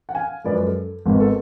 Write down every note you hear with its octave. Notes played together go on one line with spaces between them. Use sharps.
F#5
F5 G#5
F#2 F3 G#3 B4 D5
B4
A4
G#1 G#2 G#3 B3
A4